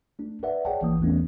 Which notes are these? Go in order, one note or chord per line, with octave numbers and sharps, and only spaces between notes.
A3 D4
A#4 B4 D5 E5 F#5
G#4 C#5 D5 F#5 G5 A5
A1 E3 A#3 D#6
E2 E3 A3 B3 C#4 D4